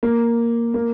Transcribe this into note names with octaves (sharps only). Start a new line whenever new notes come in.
A#3
A#3